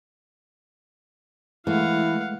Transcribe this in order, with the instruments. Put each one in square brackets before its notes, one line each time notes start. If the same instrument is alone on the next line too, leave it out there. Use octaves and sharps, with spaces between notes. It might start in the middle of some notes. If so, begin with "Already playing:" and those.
[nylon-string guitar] E3 [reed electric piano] G#3 A3 [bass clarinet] E4 [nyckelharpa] F5 F#5